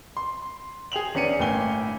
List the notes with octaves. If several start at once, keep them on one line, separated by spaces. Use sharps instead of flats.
C6
G#4 G5 F7 F#7
E2 C#4 D4 C#7 D#7
G1 A2 A#3 G5 G#5 G7